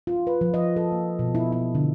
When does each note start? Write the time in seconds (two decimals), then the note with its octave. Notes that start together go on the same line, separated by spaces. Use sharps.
0.07 F4
0.27 B4
0.41 F3
0.54 D#5
0.76 A4
0.92 A#3
1.19 B2
1.35 E4
1.52 E4
1.75 D3